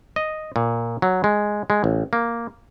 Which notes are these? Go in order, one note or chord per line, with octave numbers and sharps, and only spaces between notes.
D#5
A#2
F#3
G#3
G#3
A1
A#3